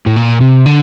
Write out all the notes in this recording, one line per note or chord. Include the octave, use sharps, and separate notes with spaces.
A2
A#2
C3
D3